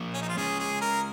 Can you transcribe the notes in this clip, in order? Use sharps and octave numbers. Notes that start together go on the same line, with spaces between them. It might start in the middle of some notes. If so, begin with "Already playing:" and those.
Already playing: F3 A#3
C#4
D#4
F4
G#3 C#4 G#4
G#4
A#4